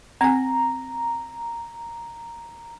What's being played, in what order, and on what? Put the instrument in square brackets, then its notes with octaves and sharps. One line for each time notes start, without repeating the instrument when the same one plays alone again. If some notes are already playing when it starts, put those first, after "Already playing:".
[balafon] C4 G#5 [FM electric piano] A#5